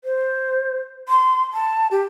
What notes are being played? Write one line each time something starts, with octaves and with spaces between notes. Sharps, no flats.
C5
C6
A5
G4